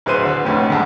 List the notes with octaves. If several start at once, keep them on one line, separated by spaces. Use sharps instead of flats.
D1 G#4 B4 C5 D#7
D3
F1 D2 A2
D2 G#2 A5